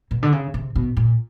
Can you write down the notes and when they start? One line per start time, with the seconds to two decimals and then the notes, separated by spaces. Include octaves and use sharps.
0.11 B2
0.23 D3
0.32 C#3
0.54 C3
0.75 B2
0.97 A#2